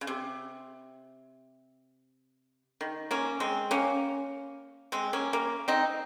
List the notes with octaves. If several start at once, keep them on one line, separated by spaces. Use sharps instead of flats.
C#3
C3
D#3
A#3 C#4
G#3 C4
A#3 C#4
G#3 C4
A#3 C#4
A#3
C4 D#4